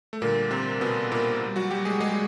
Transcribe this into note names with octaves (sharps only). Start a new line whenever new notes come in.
A3
A#2 D3 G3 A#3
C3 C4
B2 B3
A#2 A#3
A#2
G3
F#3 F#4
G3 G4
G#3 G#4
G#3 G#4